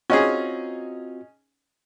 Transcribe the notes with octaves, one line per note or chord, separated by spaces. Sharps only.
C4 C#4 D#4 F4 F#4 G#4